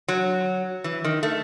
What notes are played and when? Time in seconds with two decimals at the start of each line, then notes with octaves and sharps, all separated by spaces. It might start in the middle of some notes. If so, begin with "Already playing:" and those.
0.08 F#3
0.84 E3
1.04 D#3
1.23 A3